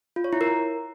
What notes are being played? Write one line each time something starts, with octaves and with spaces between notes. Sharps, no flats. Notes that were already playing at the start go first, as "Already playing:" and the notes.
F4
C#5
E4
A#4